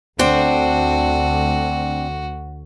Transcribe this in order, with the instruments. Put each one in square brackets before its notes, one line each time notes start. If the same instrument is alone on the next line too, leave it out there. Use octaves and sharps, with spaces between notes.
[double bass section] D2 [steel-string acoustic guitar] C4 D4 [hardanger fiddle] F#4